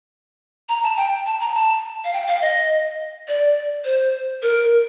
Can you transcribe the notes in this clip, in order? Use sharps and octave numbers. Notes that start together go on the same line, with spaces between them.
A#5
A5
G5
A5
A#5
A5
F5
G5
F5
D#5
D5
C5
A#4